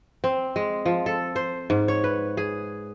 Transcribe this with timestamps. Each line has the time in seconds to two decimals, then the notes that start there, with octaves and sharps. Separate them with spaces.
0.24 C4
0.56 G#3
0.86 F3
1.06 A4
1.36 C5
1.70 G#2
1.88 C#5
2.04 B4
2.37 G#4